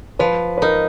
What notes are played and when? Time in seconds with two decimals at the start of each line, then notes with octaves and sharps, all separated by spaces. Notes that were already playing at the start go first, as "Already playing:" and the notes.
0.19 F3 B4
0.58 B4
0.62 D#4 A#4